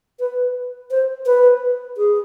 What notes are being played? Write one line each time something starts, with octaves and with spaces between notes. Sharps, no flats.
B4
C5
B4
G#4